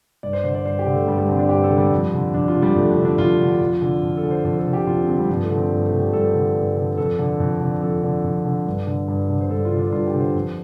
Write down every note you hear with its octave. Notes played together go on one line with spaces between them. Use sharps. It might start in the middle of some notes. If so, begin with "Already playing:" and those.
G2 D5
C5
D3 C5
D5
G2 C5
G4
D3
A3
G2 G3
G3
D3 C4
D4
G2 G4
A4
D3
G3
F2
D3
F2 D4
F4
D3
G3
F2 A3
D4
D3
D4
F2 F4
D3
F2
D3
F2
A4
D3
C5
F2 C5
A4
D3
G4
F2 F4
C4
D3 C4
G3
G2 F3
A3
D3
C4
G2 A3
A3
D3
G4
G2 A4
D3
G2
D3
F2 A4
D3
F2
D3
F2 A4
D3
F2
D3
G2
D3
G2
D3
C5
G2 A4
F4
D3
D4
G2 F4
G4
D3
C5
F2